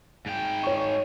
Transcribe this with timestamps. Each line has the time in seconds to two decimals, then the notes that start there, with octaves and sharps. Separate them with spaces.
0.26 G#2 G5
0.63 C#5 C#6